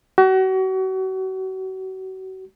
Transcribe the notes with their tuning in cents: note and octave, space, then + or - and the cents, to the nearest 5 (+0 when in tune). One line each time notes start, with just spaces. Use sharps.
F#4 +35